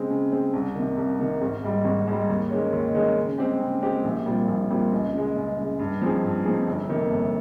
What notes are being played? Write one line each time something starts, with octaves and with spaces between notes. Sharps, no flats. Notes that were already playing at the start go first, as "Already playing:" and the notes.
Already playing: C#3 G#3 C4
C#3
G#3 C4
C2
C3 D#3
C2
C3 D#3
G#1
G#2 G3
G#1
G#2 G3
D#2
D#3 G#3 C#4
D#2
D#3 G#3 C#4
C#3
G#3 C4 G4
C#3
G#3 C4 G4
A#1
A#2 G3 C4 F4
A#1
A#2 G3 C4 F4
C#2
C#3 G#3
C#2
C#3 G#3
G2
F3 C4 D#4 G#4
G2
F3 C4 D#4 G#4
G1
F2 C3 D#3 A#3
G1